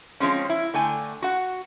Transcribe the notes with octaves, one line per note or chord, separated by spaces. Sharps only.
F3 G#3 C4 C#4
E4
D3 A3 G5 G#5
F#4 F#5